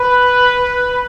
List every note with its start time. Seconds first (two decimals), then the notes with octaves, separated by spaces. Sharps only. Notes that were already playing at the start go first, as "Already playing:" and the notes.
Already playing: B4